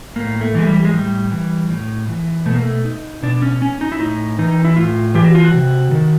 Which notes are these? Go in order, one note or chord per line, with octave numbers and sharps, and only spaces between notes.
A2 A#3
A3
E3 G#3
G3
G#3
A2 G3
E3
A2
E3
B2 A3
A#3
A3
D#4
B2 D4
C#4
C#4
D#4
E4
A2 D#4
E3 D#4
E4
A2 F4
E3 G4
F#4
F4
F#4
C3
D#3